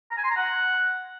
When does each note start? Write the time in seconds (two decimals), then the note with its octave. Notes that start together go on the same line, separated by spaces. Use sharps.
0.11 A#5
0.18 G#5
0.24 C6
0.31 A#5
0.37 F#5